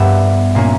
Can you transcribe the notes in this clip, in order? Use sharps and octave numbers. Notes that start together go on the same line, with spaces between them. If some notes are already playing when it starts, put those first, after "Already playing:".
Already playing: G2 G3 B3 E5
A#2 A#3 C#4